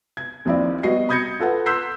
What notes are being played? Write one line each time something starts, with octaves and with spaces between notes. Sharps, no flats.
G#6
D#2 F3 C4 E4 D5
G3 B3 F#4 D#5 C7
B5 D#6 G6 G#6 A#6 C#7
F4 A4 B4 F#5
C6 E6 F#6 G6 B6 C7